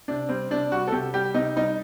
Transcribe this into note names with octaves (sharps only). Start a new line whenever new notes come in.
C3 D4
G3 C4
C3 D4
G3 F#4
A4
C3 G4
G3 G4
C3 D#4
G3 D#4